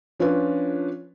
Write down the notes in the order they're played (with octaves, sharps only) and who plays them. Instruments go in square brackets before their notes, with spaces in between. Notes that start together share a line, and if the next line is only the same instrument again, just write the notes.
[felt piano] F3 C#4 D4 F4 B4